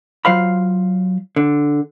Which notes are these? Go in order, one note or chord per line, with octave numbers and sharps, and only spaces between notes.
F#3 F4 C5 F5 B5
D3